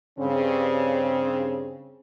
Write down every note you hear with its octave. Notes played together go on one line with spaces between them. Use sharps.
G2 C#3 C4